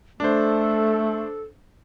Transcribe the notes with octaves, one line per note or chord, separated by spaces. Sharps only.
A3 D4 A4 C5